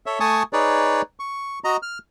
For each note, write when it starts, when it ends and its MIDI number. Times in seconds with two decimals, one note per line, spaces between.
0.06 0.19 69
0.06 0.19 73
0.06 0.19 76
0.20 0.43 57
0.20 0.43 80
0.20 0.43 81
0.20 0.43 85
0.20 0.43 87
0.53 1.02 63
0.53 1.02 68
0.53 1.02 71
0.53 1.02 73
0.53 1.02 74
1.20 1.59 85
1.64 1.77 66
1.64 1.77 75
1.64 1.77 82
1.82 1.98 89